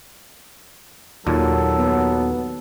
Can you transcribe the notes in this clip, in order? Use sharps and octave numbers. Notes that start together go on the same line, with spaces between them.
D#2 A#2 F#3 A4
B3